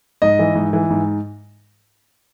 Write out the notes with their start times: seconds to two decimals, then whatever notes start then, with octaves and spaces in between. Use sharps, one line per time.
0.22 G#2 D#5
0.39 E3
0.55 G#2
0.73 E3
0.90 G#2